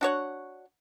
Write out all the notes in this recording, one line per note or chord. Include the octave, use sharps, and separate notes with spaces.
D4 F#4 C#5 F#5